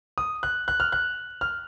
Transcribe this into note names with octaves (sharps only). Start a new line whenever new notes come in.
D#6
F#6
F#6
F6
F#6
F6